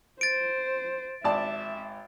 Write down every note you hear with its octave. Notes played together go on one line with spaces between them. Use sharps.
C5 A6 D7
G#1 D5 E5 A5